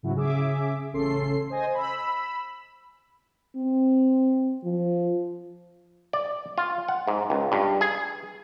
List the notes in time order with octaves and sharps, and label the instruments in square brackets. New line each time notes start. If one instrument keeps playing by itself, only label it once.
[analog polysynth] G#2 C#3 F#3 C#4 E4 F#4
C#3 G#4 E5 D6
A1 C#3 C#4 A4 C6 C7
C5 D#5 G#5 A#6
B5 E6
[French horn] C4
F3
[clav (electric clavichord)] D5
F4
F#5
G#2
C#2
G2
G#4